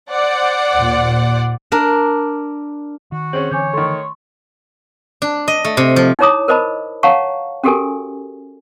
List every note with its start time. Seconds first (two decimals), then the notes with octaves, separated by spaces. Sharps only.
0.11 C5 D5 F#5
0.75 D#2 A#2
1.72 D4 A#4
3.12 D#3 F#4
3.33 C4 C#4 G#4 F#7
3.51 D3 E3 C#5 G#5 D6 G6
3.73 D#3 A3 C6 C#6
5.22 D4
5.48 D#5
5.65 A3
5.77 C3
5.96 F3
6.19 D#4 E4 C#5 A#5 D6 D#6
6.48 A#4 C5 D#5 A5 B5
7.03 C#5 F5 F#5 A5 A#5 C#6
7.64 C#4 F#4 G4 A4 A#4 G#5